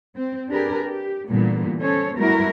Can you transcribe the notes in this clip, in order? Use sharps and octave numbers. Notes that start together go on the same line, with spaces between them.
C4
D4 G4 G#4 A#4 B4
G4
A#2 D3 E3 G3 A#3 B3
C#4 A4 C5 C#5
G3 A3 B3 E4 F#4 A#4